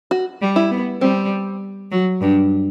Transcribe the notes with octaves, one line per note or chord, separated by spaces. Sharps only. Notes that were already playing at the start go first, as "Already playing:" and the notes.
F#4
G3
E4
B3
G3 C4
F#3
G2